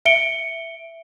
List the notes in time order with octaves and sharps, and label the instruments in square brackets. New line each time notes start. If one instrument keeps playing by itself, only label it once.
[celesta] E5 C#7 D7 G7